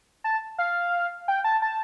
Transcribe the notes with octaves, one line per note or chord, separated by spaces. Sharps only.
A5
F5
G5
A5
A5